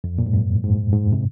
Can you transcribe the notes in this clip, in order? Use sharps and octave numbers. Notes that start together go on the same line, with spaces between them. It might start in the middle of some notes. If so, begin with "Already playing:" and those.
F2
A#2
G#2
F#2
G#2
G#2
C3